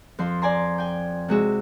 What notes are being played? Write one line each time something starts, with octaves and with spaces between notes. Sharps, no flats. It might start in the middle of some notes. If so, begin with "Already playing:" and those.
F2 F3 C6
D5 G#5 A#5 C6
G5 G#5
C3 G#3 F#4 E6